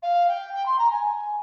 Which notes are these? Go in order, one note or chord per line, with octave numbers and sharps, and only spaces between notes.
F5
G5
G5
C6
A#5
G#5
G#5